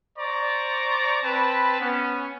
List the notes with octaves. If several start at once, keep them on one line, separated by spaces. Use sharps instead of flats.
C5 D5 A#5 C#6
C4 B4 A5 B5
B3 C#4